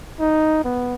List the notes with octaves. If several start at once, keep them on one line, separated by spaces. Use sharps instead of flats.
D#4
B3